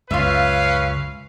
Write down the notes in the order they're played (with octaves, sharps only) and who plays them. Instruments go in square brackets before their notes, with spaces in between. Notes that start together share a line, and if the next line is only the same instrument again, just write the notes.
[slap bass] C#2 F#2 C#3 [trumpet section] C#4 B4 F5 [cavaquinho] F4 E5